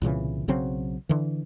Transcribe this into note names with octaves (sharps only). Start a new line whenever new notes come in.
C2 A#2 C#3 E3
B1 C#3 F#3 C4
D3 E3